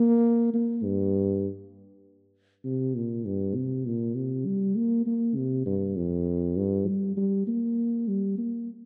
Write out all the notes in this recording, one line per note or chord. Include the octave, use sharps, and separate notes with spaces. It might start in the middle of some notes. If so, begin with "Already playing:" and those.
Already playing: A#3
A#3
G2
C3
A#2
G2
C3
A#2
C3
G3
A#3
A#3
C3
G2
F2
G2
G3
G3
A#3
G3
A#3